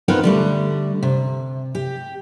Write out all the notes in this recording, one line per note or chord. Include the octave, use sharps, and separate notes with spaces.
B3 C4 D#4 F4 A#4 B4
D3 G3 A3
C3
G4